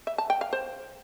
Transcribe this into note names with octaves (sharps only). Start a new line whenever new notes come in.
E5
A5
G5
F5
C5